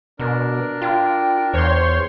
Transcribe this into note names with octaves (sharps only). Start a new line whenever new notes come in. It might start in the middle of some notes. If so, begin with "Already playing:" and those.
B2 D4 A#4
F4 G5
E2 C5 C#5 C6